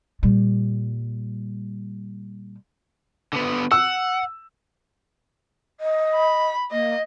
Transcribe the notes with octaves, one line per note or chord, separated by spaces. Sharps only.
A#2 G3
D3 B3
F#5 E6
D#5
B5
A#3 D#5